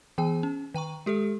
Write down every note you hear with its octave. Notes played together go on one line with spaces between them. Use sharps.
E3 B3 G#4 G5
C#4
D#3 G5 A#5 C#6
G#3 G4 A4 E5